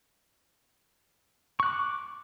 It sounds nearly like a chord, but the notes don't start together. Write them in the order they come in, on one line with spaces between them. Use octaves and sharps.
C#6 F#6 D6